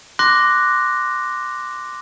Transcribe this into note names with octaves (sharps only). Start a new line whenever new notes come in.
C6 D6 F#6 A#6